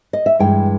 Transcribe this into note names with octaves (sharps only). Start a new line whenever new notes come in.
D#5
E5
G2 E3 G#3 G5